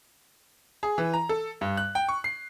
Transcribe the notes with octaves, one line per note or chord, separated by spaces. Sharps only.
G#4
E3
A#5
A4
G2
F#6
G5
C#6
C7